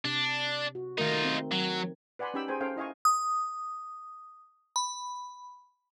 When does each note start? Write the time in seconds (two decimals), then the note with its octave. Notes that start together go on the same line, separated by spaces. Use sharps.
0.05 C3 D4
0.75 F#4
0.98 D#3 A3 D#4 F4 A#4
1.24 C4
1.51 F#3
2.19 B4 D5 F#5 G#5 B5 C6
2.34 C#4 D#4 G4 G5 B5 E6
2.48 G#4 C5 G5 G#5 A#5
2.60 C#4 A4 C5 F5 G5
2.77 E4 D#5 F5 G#5 C#6
3.05 D#6
4.76 B5